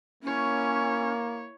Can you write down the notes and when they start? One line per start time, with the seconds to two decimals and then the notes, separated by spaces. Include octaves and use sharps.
0.23 A#3 C#4 E4 C#5